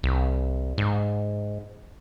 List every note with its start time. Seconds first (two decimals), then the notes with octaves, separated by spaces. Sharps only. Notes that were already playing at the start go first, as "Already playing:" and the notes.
0.03 C2
0.78 G#2